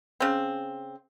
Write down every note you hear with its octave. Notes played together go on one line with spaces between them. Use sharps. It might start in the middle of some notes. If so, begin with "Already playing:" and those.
C#3 C4